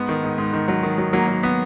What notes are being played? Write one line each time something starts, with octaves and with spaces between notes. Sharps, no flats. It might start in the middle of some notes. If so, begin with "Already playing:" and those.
Already playing: G#2 B3
D#3
G#2
G#2
D#3
F#3
D#3
F#3
F#3 A#3
F#3
B3